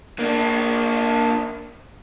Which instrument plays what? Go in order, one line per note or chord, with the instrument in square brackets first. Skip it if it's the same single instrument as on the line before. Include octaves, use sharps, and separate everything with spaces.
[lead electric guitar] A#3 D4